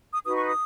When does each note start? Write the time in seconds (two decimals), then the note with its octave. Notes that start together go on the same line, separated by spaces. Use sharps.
0.13 D#6
0.24 D#4 F#4 B4 D#6
0.36 C#6
0.46 D#6